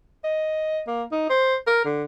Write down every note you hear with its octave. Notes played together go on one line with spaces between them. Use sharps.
D#5
A#3
D#4
C5
A#4
D3